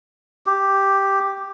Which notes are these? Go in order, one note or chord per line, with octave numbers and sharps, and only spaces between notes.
G4